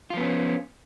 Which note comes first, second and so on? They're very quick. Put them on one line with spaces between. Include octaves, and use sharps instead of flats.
F4 F3 B3 C#4